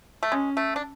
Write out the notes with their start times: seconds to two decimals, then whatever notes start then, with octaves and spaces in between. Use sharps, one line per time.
0.23 A3
0.32 G#3 C#4
0.57 A3
0.76 D4